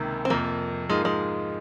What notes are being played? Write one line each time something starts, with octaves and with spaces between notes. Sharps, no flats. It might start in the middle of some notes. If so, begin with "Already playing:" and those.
Already playing: C#2 C3 D#3 A#3
C4
F2 C3 F3 A#3
G#2 F3 G#3 A#3 F4
G#3